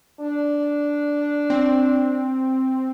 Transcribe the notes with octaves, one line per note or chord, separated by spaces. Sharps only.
D4
C4